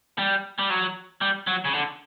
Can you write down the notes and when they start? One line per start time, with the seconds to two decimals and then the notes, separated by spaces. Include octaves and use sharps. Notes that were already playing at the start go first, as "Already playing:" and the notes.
0.18 G3
0.59 G3
0.70 F#3
1.21 G3
1.47 F#3
1.65 C#3
1.73 D3